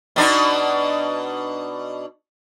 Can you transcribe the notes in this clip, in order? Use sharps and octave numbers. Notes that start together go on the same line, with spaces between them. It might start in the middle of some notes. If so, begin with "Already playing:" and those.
B2 D4 D#4